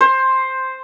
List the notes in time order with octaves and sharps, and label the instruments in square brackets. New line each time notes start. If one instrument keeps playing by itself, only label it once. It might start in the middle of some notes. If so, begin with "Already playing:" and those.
[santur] C5